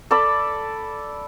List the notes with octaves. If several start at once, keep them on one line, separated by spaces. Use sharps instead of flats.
A4 D5 B5 D6